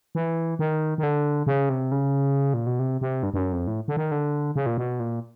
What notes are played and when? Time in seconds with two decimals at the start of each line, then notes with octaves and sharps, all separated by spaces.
0.15 E3
0.59 D#3
0.98 D#3
1.03 D3
1.47 C#3
1.69 C3
1.92 C#3
2.54 A#2
2.66 B2
2.79 C3
3.01 C3
3.23 G2
3.34 G2
3.38 F#2
3.53 F2
3.67 A2
3.88 D3
3.97 D#3
4.12 D3
4.56 C#3
4.66 A#2
4.77 B2
5.00 A#2